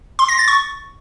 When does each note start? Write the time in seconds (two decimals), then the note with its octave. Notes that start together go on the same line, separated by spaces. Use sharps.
0.19 C6
0.29 A#6
0.38 A6
0.48 C#6